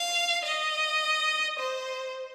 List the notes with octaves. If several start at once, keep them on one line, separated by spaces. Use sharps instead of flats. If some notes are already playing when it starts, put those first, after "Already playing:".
Already playing: F5
D#5
C5